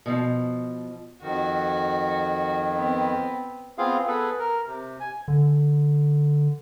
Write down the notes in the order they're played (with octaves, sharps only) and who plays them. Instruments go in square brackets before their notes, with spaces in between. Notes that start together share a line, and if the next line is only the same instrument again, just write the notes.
[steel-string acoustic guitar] B2 F3
[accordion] F2 D#3 [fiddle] F#4
[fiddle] B3 C4
[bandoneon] B3 C4 F4 G#4 F5
B3 G#4 A4 B4
A#4
C3
G#5
[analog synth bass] D3